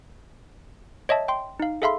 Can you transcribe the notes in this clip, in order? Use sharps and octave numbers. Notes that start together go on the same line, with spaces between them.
C#5 D#5 E5 A5
G5 C6
D#4 F5
G#4 A4 E5 F5 B5 C6